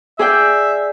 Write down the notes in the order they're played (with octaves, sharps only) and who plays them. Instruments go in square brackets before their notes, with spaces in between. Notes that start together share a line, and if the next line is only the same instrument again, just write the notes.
[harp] G#4 D5 G5 [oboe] E5